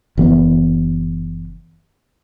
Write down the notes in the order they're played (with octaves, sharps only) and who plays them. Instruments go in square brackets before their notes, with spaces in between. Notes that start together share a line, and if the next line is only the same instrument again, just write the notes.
[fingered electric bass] F#1 E3 B3